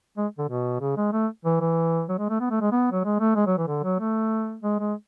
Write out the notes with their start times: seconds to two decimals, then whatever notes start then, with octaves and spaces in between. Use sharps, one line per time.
0.17 G#3
0.38 D3
0.49 B2
0.81 C#3
0.97 G#3
1.12 A3
1.45 E3
1.61 E3
2.09 F#3
2.19 G#3
2.29 A3
2.40 B3
2.51 A3
2.61 G#3
2.72 B3
2.92 F#3
3.04 G#3
3.20 A3
3.35 G#3
3.46 F#3
3.57 E3
3.68 D3
3.83 F#3
4.00 A3
4.63 G#3
4.79 G#3